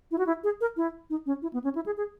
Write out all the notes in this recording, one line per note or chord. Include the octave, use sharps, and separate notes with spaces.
E4
F#4
E4
G#4
A#4
E4
D#4
C#4
E4
B3
C#4
E4
G#4
G#4